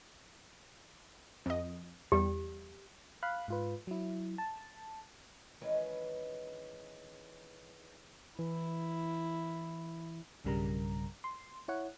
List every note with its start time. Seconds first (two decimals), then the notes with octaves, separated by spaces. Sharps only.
1.46 F2 D#5
2.12 E2 G3 G4
3.23 F5 B5 F#6
3.48 G#2 F4 B4
3.87 F#3 E4
4.38 A5
5.61 D#3 E3 G#3 C#4 G#4 B4
8.39 E3 E4
10.45 B1 G2 C#3 G3 A#4 A#5
11.24 C6
11.68 E4 C#5 F#5